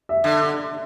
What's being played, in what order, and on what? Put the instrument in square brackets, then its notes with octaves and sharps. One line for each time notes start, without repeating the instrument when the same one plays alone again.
[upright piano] E5
[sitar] D3